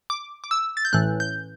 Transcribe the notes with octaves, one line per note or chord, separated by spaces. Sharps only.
D6
D6
E6
A6
G6
A1 A2 E3 F#6
G6